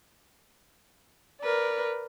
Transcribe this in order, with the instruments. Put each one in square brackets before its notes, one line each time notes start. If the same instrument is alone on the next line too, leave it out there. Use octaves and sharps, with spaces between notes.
[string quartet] A#4 B4 D5